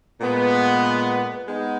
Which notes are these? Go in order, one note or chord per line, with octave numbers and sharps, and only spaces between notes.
A#2 G#3 B3
G#3 B3 D#4